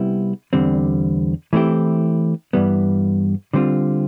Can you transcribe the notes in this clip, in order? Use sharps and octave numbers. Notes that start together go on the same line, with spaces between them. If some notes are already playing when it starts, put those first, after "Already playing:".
Already playing: C3 G3 B3 E4
E2 D3 G3 C4
E3 A3 C4 E4 G4
G2 E3 G3 B3
D3 G3 C4 F4